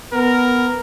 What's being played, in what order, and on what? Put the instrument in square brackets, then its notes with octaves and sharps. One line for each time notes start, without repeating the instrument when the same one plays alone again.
[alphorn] B3 [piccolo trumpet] A#4